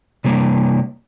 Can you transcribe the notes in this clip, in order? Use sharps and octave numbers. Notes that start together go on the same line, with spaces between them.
C3 G3 A#3